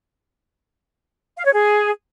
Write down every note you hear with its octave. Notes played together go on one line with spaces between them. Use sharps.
F5
C#5
G#4